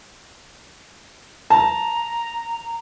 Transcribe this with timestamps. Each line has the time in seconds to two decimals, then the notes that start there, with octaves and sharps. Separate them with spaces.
1.50 A5 A#5